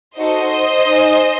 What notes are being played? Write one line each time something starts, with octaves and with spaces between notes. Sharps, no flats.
D#4 F#4 A4 C5 D#5
D#4 G#4